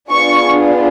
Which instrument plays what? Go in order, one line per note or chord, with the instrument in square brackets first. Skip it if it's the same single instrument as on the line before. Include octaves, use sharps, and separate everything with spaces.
[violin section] B3 D4 F4 G#4 C#6